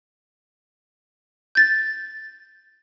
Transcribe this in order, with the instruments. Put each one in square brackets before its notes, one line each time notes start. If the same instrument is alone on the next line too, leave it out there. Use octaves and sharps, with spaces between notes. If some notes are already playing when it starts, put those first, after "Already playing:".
[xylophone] G6 A6